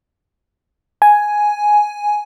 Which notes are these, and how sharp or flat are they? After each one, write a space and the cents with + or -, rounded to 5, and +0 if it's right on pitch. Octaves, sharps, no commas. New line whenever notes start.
G#5 +5